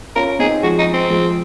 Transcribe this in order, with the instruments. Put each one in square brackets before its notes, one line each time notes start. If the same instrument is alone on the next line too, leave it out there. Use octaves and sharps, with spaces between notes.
[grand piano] C#4 F4 [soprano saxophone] A#4
[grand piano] C4 D#4 [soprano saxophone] G#4
[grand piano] F3 G#3 [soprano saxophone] F#4
[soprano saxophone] D#4
C4
[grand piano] F3 G#3